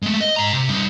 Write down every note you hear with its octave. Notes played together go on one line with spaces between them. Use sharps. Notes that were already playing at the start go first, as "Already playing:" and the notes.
G#3 A3
D#5
G#2 A#5
C3
G3 D#4